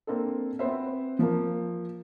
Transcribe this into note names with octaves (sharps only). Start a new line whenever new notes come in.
A#3 C4 D4 A4
B3 C4 B4 C5 E5
F3 A#3